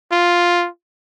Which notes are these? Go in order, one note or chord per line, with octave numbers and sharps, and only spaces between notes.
F4